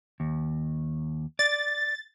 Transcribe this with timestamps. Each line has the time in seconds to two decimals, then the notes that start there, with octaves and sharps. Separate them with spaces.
0.20 D#2
1.39 D5 A6